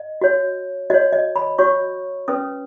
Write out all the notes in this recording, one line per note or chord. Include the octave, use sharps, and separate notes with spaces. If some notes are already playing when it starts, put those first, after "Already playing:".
Already playing: D#5
F#4 C#5
F#4 C#5 D#5
D#5
B5
F#4 C#5 C#6
C#4 B4 D#6